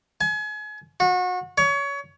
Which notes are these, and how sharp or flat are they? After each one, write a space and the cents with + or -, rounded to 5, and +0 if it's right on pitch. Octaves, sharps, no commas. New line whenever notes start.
G#5 +35
F#4 -30
C#5 +25